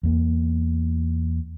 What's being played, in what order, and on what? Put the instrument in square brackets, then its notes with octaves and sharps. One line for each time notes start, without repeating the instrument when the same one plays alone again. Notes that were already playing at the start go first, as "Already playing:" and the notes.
[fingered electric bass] E2 A#3